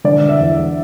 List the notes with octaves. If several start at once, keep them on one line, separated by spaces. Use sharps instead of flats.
D3 D5
E5
E2